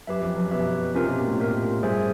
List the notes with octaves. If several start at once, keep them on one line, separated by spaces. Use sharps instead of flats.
F#2 G4 B4 E5
F2
F#2
B2 G4 B4 E5
C3 C#4 F4 A#4
B2
A#2
A2
C#4 F4 A#4
G2 G#4 C5 E5 G#5